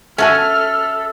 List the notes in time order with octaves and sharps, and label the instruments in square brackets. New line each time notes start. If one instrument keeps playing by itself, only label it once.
[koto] C#4 F#4 G#5 [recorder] A4 [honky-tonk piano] E5 A5 [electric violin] F6